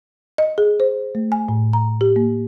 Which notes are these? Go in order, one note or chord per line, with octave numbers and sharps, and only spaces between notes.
D#5
G#4
C5
A3
G#5
A2
A#5
G4
A#3